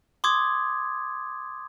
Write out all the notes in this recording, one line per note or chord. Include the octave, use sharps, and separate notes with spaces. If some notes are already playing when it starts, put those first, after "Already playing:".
C6 D6 D#6 G#6